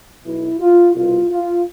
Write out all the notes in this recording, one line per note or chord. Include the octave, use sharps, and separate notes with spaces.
B1 B2 E4
F4
C2 B2 F4
F4